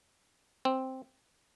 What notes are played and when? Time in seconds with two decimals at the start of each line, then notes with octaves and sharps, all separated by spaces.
0.65 C4